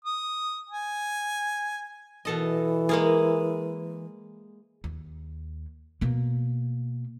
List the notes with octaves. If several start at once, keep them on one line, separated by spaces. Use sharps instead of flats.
D#6
G#5
B2 E3 A4 D#5
G#3 A#3 G#4
D#2
B2 A#3